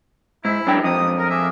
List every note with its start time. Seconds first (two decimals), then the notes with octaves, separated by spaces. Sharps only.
0.45 G#2 E4
0.67 F#2 D4 G5
0.84 F2 A#3 D#4 D#6
1.18 A#4
1.29 D4 G#4 E5